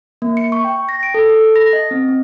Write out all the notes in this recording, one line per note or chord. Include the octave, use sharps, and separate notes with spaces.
A#3
C#7
C#6
G5
A#6
D7
A4
A4
A#6
D#5
C4
C4